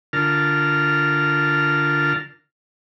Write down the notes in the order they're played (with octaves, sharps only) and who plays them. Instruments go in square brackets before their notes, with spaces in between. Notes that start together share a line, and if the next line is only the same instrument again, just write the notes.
[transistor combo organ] D3 F4 A#4 A5 F6